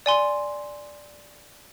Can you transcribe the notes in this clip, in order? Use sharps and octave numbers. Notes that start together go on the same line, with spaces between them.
D5 G#5 C6